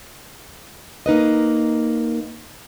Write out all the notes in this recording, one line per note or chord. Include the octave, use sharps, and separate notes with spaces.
A#3 D#4 B4 D#5